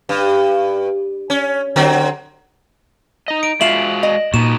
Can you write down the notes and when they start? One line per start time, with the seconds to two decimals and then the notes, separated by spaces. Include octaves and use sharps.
0.09 G2
1.30 C#4
1.76 D3 F#3 C4
3.28 D#4 D#5
3.43 D7
3.61 G#3 F4 F#4 E5 F5 E7 F#7
4.03 D#5
4.34 A#2 D#4 F#4 E7